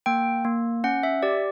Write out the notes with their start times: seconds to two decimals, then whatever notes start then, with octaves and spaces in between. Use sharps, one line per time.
0.06 A#3 G5
0.45 A#3
0.84 C#4 F#5
1.03 E5
1.23 G4 D5